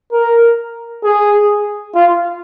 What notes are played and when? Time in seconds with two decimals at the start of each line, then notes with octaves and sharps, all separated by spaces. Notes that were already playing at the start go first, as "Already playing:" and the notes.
0.12 A#4
1.04 G#4
1.95 F4